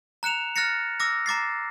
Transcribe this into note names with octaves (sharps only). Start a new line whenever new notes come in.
A#5 F#6 C#7 E7 F7
F6 F#6 A6 A#6 C#7
D6 E6 F6 A#6
A#5 D6 A6 C7